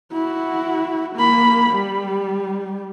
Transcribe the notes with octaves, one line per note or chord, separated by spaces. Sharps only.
E4 F#4
A#3 B5
G3